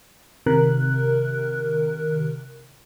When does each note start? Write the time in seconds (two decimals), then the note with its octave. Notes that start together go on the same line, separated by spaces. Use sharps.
0.46 C3 D#3 A#4 F#6